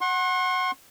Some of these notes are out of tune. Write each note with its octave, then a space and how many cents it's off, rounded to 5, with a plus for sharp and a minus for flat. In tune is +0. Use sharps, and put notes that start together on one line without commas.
F#5 +0 C6 +45